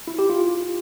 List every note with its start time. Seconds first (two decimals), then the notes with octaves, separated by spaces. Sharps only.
0.08 E4
0.19 G4
0.30 F4